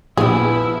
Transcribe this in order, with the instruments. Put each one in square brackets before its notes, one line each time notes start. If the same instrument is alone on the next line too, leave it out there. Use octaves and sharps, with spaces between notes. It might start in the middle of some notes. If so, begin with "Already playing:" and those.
[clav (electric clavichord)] A#1 [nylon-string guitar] F3 B3 [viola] E4 [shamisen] G#4